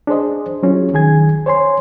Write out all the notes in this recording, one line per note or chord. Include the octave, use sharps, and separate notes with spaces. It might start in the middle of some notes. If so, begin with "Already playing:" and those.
D4 G#4 C5 D#5
F#3 C#4 E4 F4 G#4
C2 D#3 G#4 G#5 G#6
C5 C#5 G#5 C6